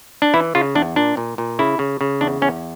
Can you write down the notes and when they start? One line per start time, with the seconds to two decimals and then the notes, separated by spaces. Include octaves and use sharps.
0.22 D4
0.34 E3 E4
0.55 C#3 F4
0.75 E2 D4
0.96 A#2 D4
1.17 A#2
1.38 A#2
1.59 C#3 E4
1.79 C#3
2.01 C#3
2.21 E2 D4
2.42 E2 C#4